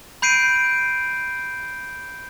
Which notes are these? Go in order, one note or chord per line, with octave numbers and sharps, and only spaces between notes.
B5 G6 C7 D7 D#7